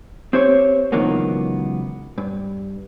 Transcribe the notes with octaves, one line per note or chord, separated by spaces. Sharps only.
C4 G4 C5 C#5
C#2 D#3 E3 F#3 A#3 B3
G2